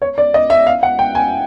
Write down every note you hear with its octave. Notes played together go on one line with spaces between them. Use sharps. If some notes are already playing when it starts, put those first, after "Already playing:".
C#5
D5
D#5
E5
F5
F#5
G5
G#5